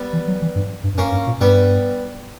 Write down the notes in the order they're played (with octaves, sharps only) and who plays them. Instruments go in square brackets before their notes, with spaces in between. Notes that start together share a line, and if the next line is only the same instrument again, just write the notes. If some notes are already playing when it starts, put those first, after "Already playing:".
Already playing: [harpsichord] G3 B3
[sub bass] E3
F#3
E3
G2
G2
G2
[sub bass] F#2 [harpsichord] A#3 C#4
[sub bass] G2
A#2
[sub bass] G2 [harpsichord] G3 B3